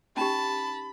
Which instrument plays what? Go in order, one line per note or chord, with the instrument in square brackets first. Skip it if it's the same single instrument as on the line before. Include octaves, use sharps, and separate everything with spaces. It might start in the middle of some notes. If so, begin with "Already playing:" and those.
[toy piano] C#4 D#4 G4 [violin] A5 [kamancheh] B5